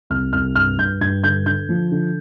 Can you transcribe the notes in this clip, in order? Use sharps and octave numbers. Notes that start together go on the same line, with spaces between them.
C2 F6
C2 F6
G2 F6
G2 G6
G2 G#6
D3 G6
D3 G6
F3
D3